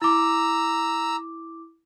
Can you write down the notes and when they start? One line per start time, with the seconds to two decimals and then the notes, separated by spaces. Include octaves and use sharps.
0.02 E4 A#5 D6 E6